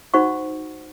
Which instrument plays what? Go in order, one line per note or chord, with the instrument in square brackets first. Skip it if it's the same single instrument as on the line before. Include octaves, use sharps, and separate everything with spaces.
[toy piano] D#4 F#4 C5 F#5 C#6